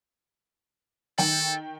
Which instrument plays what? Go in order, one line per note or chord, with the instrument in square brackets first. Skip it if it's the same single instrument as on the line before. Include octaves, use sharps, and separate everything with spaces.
[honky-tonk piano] D#3 G5 F#7 [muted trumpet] A4